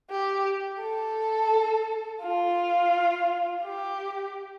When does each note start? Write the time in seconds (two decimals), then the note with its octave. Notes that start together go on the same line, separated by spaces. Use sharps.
0.11 G4
0.81 A4
2.22 F4
3.64 G4